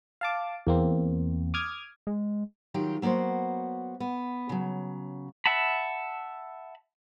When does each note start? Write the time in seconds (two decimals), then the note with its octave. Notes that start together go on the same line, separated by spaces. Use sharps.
0.21 F5 A5 D6
0.67 E2 A#3 C4
1.54 D6 D#6 F6 G#6
2.07 G#3
2.74 D#3 F#3 F4 G4 G5
3.02 F#3 A#3 B3 F#4 C5
4.00 B3
4.49 C#3 F#3
5.46 E5 F#5 A5 B5